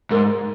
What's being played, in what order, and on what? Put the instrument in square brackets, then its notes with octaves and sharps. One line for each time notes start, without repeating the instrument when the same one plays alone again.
[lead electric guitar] G#2 [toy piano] A#4